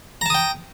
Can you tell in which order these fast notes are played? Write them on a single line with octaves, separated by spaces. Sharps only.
A#5 A5 D#6 G5